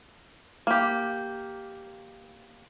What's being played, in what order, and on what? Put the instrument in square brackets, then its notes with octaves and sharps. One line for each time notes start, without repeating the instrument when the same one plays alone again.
[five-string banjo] A#3 G4